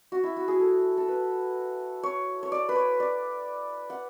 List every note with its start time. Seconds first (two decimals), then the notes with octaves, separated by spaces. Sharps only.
0.12 F#4
0.24 E4
0.37 F#4
0.48 G#4
0.60 A4
0.97 A4
1.08 B4
2.03 C#5
2.43 C#5
2.52 D5
2.69 B4
2.75 C#5
3.00 D5
3.90 F#5